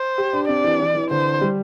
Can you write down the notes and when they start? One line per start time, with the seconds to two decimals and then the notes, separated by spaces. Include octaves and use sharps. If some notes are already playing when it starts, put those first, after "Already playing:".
Already playing: C5
0.18 G4
0.33 D4
0.48 C4 D5
0.64 E3
0.80 E3
0.95 E3
1.11 D3 C5
1.41 G3